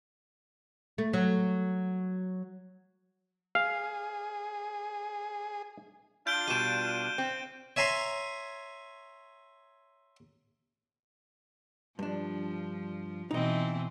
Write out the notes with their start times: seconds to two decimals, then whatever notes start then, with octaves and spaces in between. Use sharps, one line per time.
0.98 A3
1.13 F#3
3.55 G#4 F5
6.27 D4 F4 G6 D7 G7
6.48 B2 G3 D#7 E7
7.18 C4
7.76 C#5 E5 G#5 A#5 C6
11.99 G2 F3 D4
13.31 B2 E3 C4 D#4 D#5